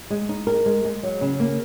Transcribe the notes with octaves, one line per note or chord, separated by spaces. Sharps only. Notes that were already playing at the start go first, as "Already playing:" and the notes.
G#3
D#4
A#4
G#3
G#3
F#3
C#3
A#3